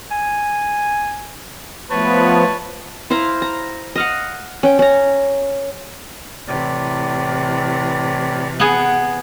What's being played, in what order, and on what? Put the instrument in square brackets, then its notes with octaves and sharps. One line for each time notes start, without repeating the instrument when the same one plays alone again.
[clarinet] G#5
[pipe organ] F3 B3 [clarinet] A3 [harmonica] B4 C#5 A5
[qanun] E4 C5 F5 A#5
A#5
D#5 F5 F#5
C#4 G5
C#4 A#5
[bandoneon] A2 D5 [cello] C3 E3
[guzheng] B3 G#4 [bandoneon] F#5 G5